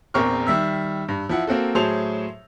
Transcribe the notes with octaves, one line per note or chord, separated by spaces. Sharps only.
A#1 E2 C4 A#4 C#6 F6
D#3 G3 E5 E6
G2
F3 E4 F#5
A#3 C4 F#4 A4
A2 F#3 G#4 C5 A5 F7